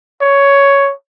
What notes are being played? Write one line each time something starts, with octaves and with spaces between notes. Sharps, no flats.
C#5